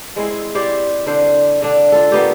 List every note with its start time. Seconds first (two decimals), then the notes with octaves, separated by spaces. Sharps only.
0.16 G#3 C4 E4
0.55 E4 G4 C5 D5
1.06 D3 D4 C5
1.62 D3 D4
1.92 F4 A4
2.12 A#3 B3 G4